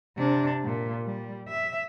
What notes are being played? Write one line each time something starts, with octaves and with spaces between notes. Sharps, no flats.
C3 D4
A#2
G3
E5